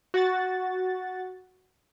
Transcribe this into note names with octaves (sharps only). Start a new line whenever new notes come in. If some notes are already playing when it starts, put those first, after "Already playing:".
F#4 F#5 A6